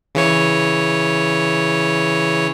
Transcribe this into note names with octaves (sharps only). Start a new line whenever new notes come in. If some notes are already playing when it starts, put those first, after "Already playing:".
C#3 E3 C#5